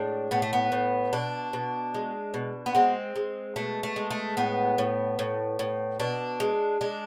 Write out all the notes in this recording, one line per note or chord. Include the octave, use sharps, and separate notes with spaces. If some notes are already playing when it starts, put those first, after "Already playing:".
Already playing: A2 G#3 D4
A2 B3
A3
B3
A2
B2 D4
B2
G#3
B2
B3
G#3 C4
G#3
B2 A3
A3
G#3
A3
A2 B3
A2
A2
A2
B2 D4
G#3
G#3 D4